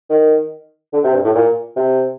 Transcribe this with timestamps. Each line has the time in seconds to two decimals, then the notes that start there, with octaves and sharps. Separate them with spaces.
0.10 D#3
0.93 D3
1.04 C3
1.14 G2
1.24 A2
1.35 A#2
1.76 C3